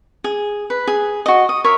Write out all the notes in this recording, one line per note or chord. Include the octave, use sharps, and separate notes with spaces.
G#4
B4
G#4
F#4 D#5
D#6
A#4 C#5 E5